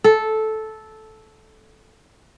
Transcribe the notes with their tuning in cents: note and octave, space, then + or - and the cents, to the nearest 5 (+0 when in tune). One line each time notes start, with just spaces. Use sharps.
A4 -10